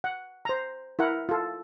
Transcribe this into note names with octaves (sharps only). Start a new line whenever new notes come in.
F#5
C5 A#5
E4 A#4 F#5
F4 A4